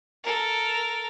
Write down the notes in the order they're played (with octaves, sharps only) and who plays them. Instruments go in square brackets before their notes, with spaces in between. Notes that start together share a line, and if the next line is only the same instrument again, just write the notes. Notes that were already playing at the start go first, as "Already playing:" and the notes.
[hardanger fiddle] A4 A#4